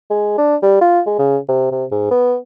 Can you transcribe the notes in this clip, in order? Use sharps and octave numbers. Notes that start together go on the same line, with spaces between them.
G#3
D4
G3
F4
G#3
C#3
C3
C3
G#2
B3